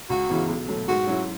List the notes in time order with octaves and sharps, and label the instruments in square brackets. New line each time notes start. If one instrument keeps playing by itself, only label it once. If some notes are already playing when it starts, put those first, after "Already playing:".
[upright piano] C#2 [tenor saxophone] F#4
[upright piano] C#3 E3 B3
B1
B2 F#3 A3
[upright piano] G#2 [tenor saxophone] F#4
[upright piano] F#3 C#4 E4